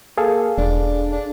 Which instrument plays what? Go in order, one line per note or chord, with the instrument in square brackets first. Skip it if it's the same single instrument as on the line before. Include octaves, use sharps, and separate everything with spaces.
[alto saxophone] A#3 [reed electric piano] G#4 A4 F5
[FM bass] E1 [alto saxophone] D4
[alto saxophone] D4